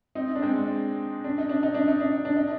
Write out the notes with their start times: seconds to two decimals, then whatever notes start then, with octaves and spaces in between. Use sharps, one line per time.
0.15 C4 D#4
0.35 D4
0.42 G#3 C4
1.24 D4
1.38 D#4
1.49 D4
1.63 D#4
1.75 D4
1.88 D#4
2.00 D4
2.12 D#4
2.25 D4
2.36 D#4